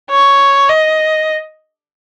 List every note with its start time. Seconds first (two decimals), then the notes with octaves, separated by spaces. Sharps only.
0.11 C#5
0.70 D#5